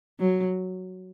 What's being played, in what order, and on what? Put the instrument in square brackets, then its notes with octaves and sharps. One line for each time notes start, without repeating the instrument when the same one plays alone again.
[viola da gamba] F#3